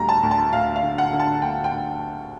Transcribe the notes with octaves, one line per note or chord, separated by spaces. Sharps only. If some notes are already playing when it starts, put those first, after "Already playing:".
Already playing: D2 G3 A#5
A5
D2
A5
D2 F5
F5
D3
F#5
D3
A5
D2 G5
G5
D2